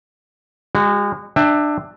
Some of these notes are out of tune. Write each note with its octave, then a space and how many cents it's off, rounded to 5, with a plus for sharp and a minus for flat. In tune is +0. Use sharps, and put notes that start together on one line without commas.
G#3 -35 F#4 +0
D4 +20 E5 +0 G5 +30